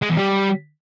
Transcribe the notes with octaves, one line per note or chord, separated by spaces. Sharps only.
G#3
E2
G3